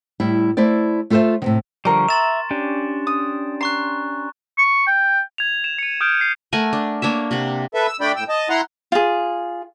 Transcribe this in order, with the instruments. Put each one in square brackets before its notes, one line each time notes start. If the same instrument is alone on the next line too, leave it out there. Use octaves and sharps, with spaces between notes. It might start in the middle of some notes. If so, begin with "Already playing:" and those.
[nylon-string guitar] A2 G3 E4
A3 E4 C5 D5
A3 F4 A4 A#4 C5 E5
A2 C3 D#3
[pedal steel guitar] D3 F3 G3 [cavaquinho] A#4 C#6
[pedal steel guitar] E5 A#5 [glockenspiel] C6 A6 E7
[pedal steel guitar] C#4 D4 G4
[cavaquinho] D#6
[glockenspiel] A#5 C#6 F#6 [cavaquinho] C6
[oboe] C#6
G5
[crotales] G#6 F7
E7
C#7 D#7
D#6 F6 G6 D7
C7
[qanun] A3 A#4 F#5 G#5
D4
A#3 D4 C#5 E5
C3 F#5
[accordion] A4 B4 E5
E6
A3 D4 D5 G5 B5
A2 G5 E6
D#5 A5
E4 F#5 A#5 C6
[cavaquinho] F4 G#4